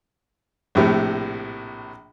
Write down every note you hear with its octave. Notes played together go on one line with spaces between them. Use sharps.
A#1 A2 C3